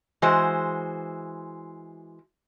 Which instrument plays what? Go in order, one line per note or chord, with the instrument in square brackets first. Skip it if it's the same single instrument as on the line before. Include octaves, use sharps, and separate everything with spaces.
[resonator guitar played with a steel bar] E3 G#3 F#4 C5